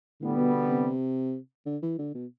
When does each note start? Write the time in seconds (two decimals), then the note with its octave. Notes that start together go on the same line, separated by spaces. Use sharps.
0.21 A2 D3 G3 B3
0.37 B2
0.53 B2
0.69 C3
1.66 D3
1.82 E3
1.99 D3
2.14 B2